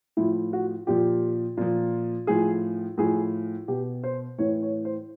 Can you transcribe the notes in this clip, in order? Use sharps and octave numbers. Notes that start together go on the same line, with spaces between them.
A2 F3 E4
F#4
A#2 F3 G4
A#2 F3
A2 F3 G#4
A2 F3 G#4
B2 G4
C5
A2 E3 C#5
C#5
C5